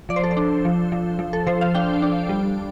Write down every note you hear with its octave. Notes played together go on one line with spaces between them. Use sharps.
F3 D5
C5
A4
C5
D4
F3
F3
F3
A4
F3 C5
F5
D4 G5
D4
G3